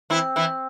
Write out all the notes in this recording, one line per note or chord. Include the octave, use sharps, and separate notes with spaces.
E3 C4 E4
E3 E4